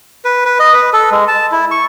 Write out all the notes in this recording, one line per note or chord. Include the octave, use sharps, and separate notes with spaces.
B4
B4
D#5
B4
A4
G#3
A5
E4
C#6